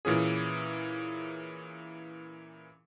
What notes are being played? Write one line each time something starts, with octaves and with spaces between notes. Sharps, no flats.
A#2 E3 C#4 G#4